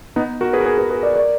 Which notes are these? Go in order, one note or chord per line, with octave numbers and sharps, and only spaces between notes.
B3 D#4
F#4 A#4
G#4 B4
A#4
G#4 B4
G#4 B4
G#4 B4
A#4 D5
A#4 D5